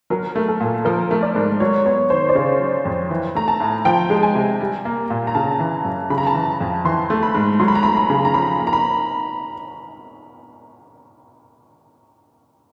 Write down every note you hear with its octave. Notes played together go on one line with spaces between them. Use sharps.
F#3 A#4
A3
A4
A#2
F3 A#4
A3
D5
G#2
F#3 C#5
B3 C#5
D#3 C5
D5
C#3 C#5
F#3
F2
E3
A3 A#5
A5
A2
F3 G5
G#3
G#5
C3
G3
A#3
A#2
A#5
C#3 A5
E3
F#2
C#3 B5
A#5
A5
E3 A#5
F2
E3 C6
A3
B5
G#2
F#3 C6
B5
A#5
A3 B5
B5
C#3
A#5
F3 B5
A#3
A#5
B5